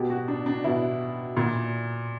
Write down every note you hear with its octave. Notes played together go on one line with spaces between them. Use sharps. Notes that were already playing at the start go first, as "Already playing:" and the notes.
Already playing: B2 G4
F#4
D4
D4
B2 E4
A#2